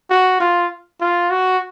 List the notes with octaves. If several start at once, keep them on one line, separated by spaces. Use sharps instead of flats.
F#4
F4
F4
F#4